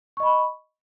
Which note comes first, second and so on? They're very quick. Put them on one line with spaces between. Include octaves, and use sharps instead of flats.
C#6 D#5 B5